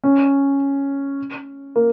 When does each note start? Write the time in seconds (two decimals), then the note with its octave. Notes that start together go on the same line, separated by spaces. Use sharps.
0.04 C#4
1.76 A#3